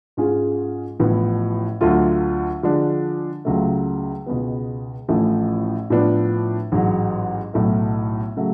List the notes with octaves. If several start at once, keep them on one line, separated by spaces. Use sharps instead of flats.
G#2 G#3 C#4 F4 G#4
A1 A2 F3 B3
D2 D3 F#3 A3 F4
D3 F3 G#3 D4
C#2 C#3 F#3 A3
C#2 B2 G#3 B3
A1 A2 F3 A3 C#4
A2 F3 B3 D4
A1 G#2 F#3
B1 A2 F#3 A3
C#3 F#3 A3